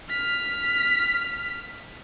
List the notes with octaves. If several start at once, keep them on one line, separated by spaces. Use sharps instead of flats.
F6 B6